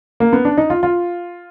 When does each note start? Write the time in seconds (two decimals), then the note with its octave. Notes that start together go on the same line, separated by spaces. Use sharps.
0.20 A#3
0.33 B3
0.45 D4
0.58 D#4
0.70 F4
0.83 F4